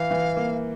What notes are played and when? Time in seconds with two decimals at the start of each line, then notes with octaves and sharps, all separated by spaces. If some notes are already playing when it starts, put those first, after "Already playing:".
Already playing: E3 F5
0.11 E3
0.36 A#3